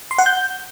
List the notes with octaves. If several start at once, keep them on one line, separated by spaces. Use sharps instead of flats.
C6
F#5
G6